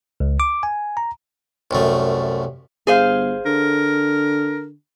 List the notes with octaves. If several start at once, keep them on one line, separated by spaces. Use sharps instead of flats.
C#2
D6
G#5
A#5
C2 F#2 A3
G1 G#4 C5 F5
D3 A#4